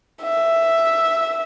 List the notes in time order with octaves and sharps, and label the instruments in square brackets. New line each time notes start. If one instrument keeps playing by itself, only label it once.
[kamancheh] E5